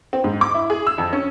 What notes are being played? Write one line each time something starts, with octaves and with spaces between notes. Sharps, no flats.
C4
G#2
D6
E4
G#4
E6
F2
C#4